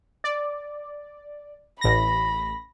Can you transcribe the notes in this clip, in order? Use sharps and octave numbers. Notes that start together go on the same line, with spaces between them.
D5
A1 B5 A#6